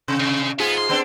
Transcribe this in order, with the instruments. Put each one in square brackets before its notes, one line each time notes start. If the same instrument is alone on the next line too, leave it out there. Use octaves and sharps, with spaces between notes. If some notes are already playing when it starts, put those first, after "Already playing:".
[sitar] C3
[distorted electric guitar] C#3
[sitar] G#2 F4 G#4 [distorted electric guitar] B3
[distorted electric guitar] C6
[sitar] B3 C4 D4